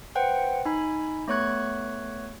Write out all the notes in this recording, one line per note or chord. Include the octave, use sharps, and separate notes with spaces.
B4 C5 F#5 G5
D#4 G#5 B5
A3 B3 C#5 C#6 F#6 G#6